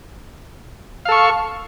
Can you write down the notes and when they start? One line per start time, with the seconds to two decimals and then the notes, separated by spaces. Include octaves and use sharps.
1.05 F5
1.09 A4
1.12 C#6